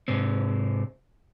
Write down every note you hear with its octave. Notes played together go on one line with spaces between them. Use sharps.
G#2 C3 C4